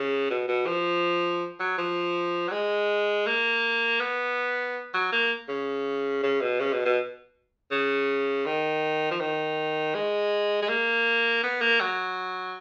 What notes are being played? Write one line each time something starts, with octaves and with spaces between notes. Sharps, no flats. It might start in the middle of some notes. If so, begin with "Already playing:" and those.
Already playing: C#3
B2
B2
F3
F#3
F3
F#3
G#3
A#3
B3
F#3
A#3
C#3
C#3
B2
C#3
B2
B2
C#3
D#3
F3
D#3
G#3
G#3
A#3
B3
A#3
F#3